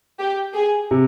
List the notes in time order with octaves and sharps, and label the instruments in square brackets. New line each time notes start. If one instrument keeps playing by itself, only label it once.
[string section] G4
G#4
[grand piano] C3